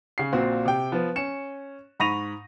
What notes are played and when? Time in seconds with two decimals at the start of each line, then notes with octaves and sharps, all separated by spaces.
0.18 C#3 C7
0.33 A#1 A#2 C4 F#4
0.65 C3 G5
0.92 F3 B3
1.16 C#4 C#7 E7
2.00 G#2 B5 C#6 A#6 D#7 F7